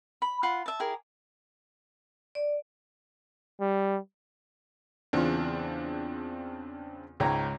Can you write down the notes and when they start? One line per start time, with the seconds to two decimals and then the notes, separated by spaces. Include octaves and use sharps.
0.22 B5
0.43 F4 F#5 B5
0.66 E5 A5
0.80 E4 G4 G#4 A#4
2.35 D5
3.60 G3
5.13 E2 C#3 C4 D4 F4
7.20 C#2 G#2 C#5 G5 A#5